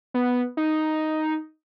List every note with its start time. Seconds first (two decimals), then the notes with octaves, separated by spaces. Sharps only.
0.14 B3
0.57 D#4